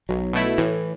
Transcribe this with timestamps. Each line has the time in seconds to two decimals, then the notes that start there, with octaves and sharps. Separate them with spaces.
0.09 B1 F#3
0.33 B2 A3 E4
0.58 A2 E3